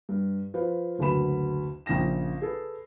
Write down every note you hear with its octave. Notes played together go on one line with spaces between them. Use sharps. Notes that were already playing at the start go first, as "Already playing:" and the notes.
G2
F3 F4 B4 C5
F#1 D2 F#3 B4 B5 E7
A#1 C#3 G5 A#6 E7
G#4 A4 B4